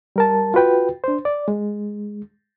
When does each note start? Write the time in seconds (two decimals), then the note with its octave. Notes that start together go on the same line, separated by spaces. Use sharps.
0.16 G3 A#4 A5
0.54 F4 F#4 B4 G5
1.04 D4 C5
1.25 D5
1.48 G#3